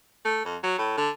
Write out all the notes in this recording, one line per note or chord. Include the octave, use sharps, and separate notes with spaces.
A3
F2
F#3
A2
D3